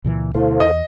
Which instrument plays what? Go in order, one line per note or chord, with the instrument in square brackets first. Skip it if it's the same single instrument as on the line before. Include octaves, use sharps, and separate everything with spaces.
[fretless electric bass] C#2 A#2 E3
[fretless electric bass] D2 B2 A3 [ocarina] E4 [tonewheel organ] A4 C5 F5
[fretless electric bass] E2 [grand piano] D#5